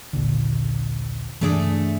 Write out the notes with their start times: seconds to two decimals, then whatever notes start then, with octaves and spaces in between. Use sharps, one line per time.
0.13 D#1 A#1 D3
1.41 G2 C#3 E3 A3 D4 G#4